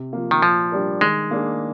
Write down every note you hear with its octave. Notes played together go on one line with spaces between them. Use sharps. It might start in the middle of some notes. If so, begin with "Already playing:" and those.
Already playing: C3
F3 A#3
D#3
A#2 F3
G3 D4 G4 A#4
D#3 G#3
A#3 D4 G#4